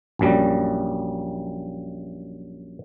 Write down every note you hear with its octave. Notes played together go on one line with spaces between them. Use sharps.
A#1 F#2 G3